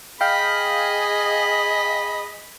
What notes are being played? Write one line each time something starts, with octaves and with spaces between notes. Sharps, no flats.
G#4 D#5 F5 G5 B5